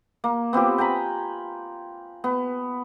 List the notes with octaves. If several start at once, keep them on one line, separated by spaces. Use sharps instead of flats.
A#3
B3 C4 F4 G4
G5 G#5 A#5 B5
B3